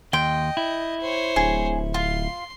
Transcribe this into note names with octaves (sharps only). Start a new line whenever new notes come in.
D#2 D#5 G5 C6
E4
C5 C#5
D1 G#4
F4 C6